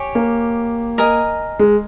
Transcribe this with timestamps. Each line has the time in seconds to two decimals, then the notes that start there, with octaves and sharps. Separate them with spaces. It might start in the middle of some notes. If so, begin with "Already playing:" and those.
Already playing: G4 C#5 G#5
0.15 A#3
0.98 A#4 D#5 G#5
1.59 G#3